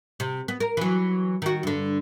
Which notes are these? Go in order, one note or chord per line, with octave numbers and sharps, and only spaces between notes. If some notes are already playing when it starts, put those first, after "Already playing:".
C3
B3
A#4
E3 F#3
D#3 F#4
G2 D3